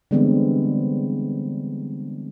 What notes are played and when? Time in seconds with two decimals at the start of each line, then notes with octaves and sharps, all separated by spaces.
0.11 D3 E3 G3 G#3 B3 C4